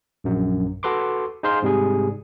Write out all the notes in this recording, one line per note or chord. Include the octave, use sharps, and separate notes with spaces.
A#1 F#2
F#4 A4 B4 C6 D6
D#4 G#4 C5 F5 C6
G#2 C3 G3 G#4